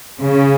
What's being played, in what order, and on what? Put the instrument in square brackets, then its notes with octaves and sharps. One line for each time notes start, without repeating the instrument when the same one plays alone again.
[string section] C#3